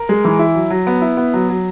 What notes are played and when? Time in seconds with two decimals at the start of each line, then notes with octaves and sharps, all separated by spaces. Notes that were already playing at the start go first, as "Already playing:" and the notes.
Already playing: A#4
0.09 G#3
0.25 E3
0.39 E4
0.55 F#3
0.70 F#3
0.87 B3
1.01 E4
1.17 B3
1.34 F#3
1.49 F#3